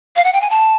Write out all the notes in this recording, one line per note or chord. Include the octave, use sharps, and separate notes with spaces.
F5
F#5
G5
G#5
A5